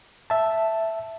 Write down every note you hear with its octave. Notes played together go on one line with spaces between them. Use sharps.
E5 A5